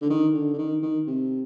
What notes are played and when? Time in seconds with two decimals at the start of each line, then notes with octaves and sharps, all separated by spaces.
0.01 D3
0.10 D#3
0.34 D3
0.53 D3
0.58 D#3
0.82 D#3
1.07 C3